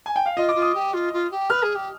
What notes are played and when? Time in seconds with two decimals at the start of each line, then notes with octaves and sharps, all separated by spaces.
0.06 G#5
0.16 G5
0.26 F5
0.36 F4 D#5
0.49 D6
0.55 F4
0.62 D#6
0.75 G4
0.94 F4
1.13 F4
1.31 G4
1.50 B4 F6
1.63 G#4
1.75 G4